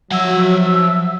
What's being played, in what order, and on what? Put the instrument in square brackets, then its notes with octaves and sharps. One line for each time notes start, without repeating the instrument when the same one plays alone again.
[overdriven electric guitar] F3 F#5 [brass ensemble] F#3 [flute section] E5 E6